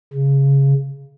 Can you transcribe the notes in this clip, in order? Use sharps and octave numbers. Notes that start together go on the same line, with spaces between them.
C#3